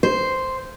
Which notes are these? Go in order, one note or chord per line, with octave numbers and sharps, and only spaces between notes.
C5